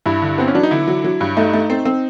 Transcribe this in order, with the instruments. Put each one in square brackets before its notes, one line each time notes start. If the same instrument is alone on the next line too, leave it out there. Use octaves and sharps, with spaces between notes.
[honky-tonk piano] G2 [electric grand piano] E4
[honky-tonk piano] D3
[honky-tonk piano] B3 [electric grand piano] C4
[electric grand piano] C#4
[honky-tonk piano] F#3 [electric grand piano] D4
[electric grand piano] D#4
[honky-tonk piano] D3 [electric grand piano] E4
[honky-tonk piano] F#3
F#3
G2
[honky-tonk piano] A3 [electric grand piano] D#4
[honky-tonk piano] A3
C4
C4